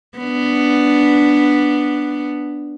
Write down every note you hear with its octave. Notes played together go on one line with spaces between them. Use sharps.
B3 D4